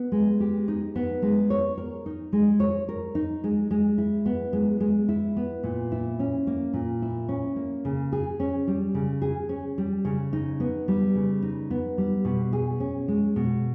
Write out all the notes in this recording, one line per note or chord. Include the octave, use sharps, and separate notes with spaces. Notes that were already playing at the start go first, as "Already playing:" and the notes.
Already playing: B3
G#3
G4
D#4
B3
G#3
C#5
A#4
D#4
G#3
C#5
A#4
D#4
G#3
G#3
E4
B3
G#3
G#3
E4
B3
A#2
E4
C#4
A#3
A#2
E4
C#4
A#3
C#3
G#4
C#4
G3
C#3
G#4
C#4
G3
C#3
D#4
B3
G3
C#3
D#4
B3
G3
B2
G#4
C#4
G#3
B2